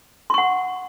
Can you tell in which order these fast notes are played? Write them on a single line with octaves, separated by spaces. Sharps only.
C6 C#6 F#5